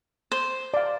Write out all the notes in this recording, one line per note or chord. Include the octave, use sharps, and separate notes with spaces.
C5
D5 F5